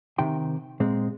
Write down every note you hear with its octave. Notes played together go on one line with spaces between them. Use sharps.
C3 D#3 G5 C6
A#2 G#3 C4